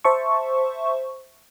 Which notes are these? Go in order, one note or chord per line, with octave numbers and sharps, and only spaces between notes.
C5 E5 A5 C#6